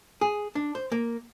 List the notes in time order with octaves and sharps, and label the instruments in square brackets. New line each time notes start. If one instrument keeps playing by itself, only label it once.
[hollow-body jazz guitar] G#4
D4
C5
A#3